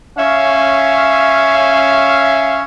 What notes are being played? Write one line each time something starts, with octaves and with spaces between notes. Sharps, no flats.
C#4 E5 F5